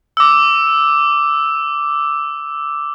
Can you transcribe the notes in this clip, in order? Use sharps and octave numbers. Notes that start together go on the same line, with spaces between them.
D6 E6